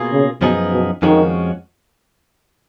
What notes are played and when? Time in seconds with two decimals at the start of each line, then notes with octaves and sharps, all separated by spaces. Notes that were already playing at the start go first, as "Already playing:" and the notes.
Already playing: B2 A#3 F4 G#4
0.12 C#3
0.41 F#2 B2 F3 B3 D#4 G#4
0.72 B2
1.02 F2 D#3 F3 G#3 C#4 F#4